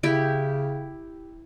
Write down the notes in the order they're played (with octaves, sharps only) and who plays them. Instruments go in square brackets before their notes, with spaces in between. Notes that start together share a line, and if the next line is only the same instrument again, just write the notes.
[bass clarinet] C#3 [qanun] E4 G4 E5